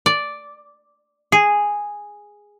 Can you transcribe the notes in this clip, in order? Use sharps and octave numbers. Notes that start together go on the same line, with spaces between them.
D5
G#4